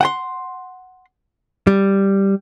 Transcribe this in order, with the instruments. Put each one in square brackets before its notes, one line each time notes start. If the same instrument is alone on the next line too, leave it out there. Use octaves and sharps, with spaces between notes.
[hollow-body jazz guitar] F#5 G5 C6
G3